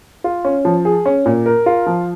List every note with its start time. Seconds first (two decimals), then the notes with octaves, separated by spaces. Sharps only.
0.24 F4
0.45 C#4
0.65 F3
0.85 G#4
1.06 C#4
1.26 A#2
1.46 A#4
1.66 F4
1.86 F3